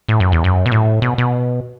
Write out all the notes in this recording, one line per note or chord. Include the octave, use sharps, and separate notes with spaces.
A2
F#2
E2
F#2
B2
A2
B2
B2